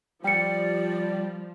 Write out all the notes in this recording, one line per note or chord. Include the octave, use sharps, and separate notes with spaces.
F3 G3 D5 G5 C#7